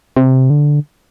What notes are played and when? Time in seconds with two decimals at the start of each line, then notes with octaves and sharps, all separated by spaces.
0.17 C3
0.50 D3